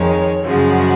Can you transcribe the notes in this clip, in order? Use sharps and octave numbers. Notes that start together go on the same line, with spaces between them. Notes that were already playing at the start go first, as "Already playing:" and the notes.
Already playing: F2 D#3 G#3 C#5
F#2 C#3 F3 G#3 F#4